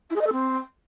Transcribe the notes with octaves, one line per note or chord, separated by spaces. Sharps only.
E4
G#4
D#5
A4
C4